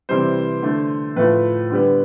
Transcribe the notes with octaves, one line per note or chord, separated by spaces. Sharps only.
C3 E3 G3 C5
D3 A3
A2 F3 A3 B4
D3 G3 B3